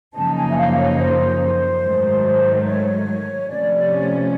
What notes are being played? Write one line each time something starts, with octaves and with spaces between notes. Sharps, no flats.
F#2 C#3 F3 A#3 D#4 A5
G#5
E5
F5
C#5
C5
G#2 D#3 F#3 A3
C5
C#5
C3 F3 A3 C#4 D5